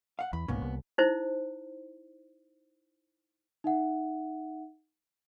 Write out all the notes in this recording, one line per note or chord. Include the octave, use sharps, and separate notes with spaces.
F5 F#5
E2 B5
C2 G#2 B2 A#3 B3 C#4
C2
D#4 E4 C5
D#4 E5 F#5